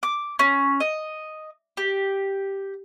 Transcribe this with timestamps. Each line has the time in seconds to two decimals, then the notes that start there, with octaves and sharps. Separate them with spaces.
0.03 D6
0.39 C#4
0.80 D#5
1.77 G4